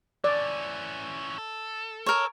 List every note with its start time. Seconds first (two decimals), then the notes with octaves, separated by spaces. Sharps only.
0.24 E3 C#4 D5
1.38 A4
2.06 A#4 C#5